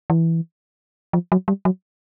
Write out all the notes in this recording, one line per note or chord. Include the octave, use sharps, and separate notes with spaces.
E3
F3
F#3
G3
F#3